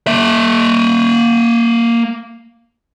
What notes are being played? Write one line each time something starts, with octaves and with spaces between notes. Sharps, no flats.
A#3 E5